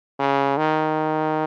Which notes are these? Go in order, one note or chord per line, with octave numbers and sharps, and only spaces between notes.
C#3
D#3